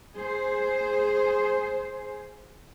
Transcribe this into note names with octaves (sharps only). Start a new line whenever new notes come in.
G#4 C5